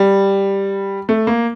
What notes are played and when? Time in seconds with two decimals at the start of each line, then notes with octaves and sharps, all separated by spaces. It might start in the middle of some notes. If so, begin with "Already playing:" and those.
Already playing: G3
1.09 A3
1.27 A#3